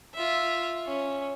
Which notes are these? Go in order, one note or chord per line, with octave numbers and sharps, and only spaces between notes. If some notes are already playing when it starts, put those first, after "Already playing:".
F4 E5
C#4